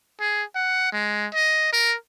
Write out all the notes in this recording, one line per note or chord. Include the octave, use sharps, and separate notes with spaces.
G#4
F#5
G#3
D#5
A#4